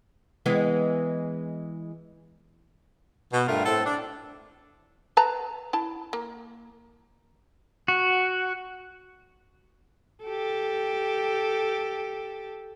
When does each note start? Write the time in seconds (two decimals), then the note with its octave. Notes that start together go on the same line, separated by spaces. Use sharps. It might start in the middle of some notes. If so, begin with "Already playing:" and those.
0.46 E3 G#3 B3
3.33 B2
3.48 G2 A3 F4 A#4
3.66 A2 C4 A4
3.86 D4
5.17 B4 A5 A#5
5.73 E4 A5
6.13 A#3
7.88 F#4
10.24 G4 A4